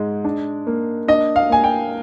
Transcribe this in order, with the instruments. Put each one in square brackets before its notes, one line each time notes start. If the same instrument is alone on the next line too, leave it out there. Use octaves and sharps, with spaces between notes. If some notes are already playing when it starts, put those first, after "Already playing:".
Already playing: [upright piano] G#2 G#3
D4
A#3
D4 D#5
F5
A#3 G#5
G5